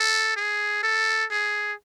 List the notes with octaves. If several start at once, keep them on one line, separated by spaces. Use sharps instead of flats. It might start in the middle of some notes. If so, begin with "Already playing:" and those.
Already playing: A4
G#4
A4
G#4